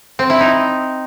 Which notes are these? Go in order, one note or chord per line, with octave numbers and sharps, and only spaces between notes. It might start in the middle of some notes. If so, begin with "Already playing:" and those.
C4
E4
D#4